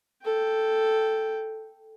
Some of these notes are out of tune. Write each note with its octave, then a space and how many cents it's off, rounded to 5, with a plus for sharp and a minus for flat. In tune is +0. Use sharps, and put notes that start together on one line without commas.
A4 +0 G5 +0